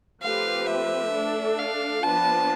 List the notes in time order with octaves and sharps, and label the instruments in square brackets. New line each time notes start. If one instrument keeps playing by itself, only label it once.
[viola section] F3 A3 C4 G4 B4 [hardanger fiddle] F5
[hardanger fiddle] E5
[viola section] A3 D4 A4
[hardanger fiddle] F5
[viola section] F3 B3 D4 F4 B4 [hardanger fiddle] A5